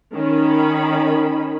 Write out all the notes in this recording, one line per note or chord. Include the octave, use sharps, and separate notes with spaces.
D#3 C#4 B5